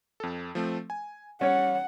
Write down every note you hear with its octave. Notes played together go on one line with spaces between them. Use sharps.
F2 A4
F3 A3 C4
G#5
G3 C#4 C#5 F#5